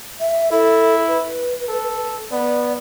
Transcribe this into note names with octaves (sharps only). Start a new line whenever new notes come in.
E5
E4 A4
B4
A4
B3 D5